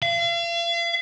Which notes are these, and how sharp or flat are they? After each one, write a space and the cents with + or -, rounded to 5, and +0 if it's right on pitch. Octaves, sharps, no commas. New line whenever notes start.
F5 -40